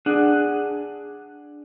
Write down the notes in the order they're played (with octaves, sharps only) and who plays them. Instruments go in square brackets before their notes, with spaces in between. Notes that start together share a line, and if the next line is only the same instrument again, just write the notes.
[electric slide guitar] D4 G#4 F#5